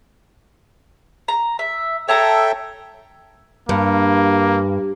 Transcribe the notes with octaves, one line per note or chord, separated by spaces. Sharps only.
A#5
E5
A4 C#5 E5 G5 A5 A#5
G2 A#3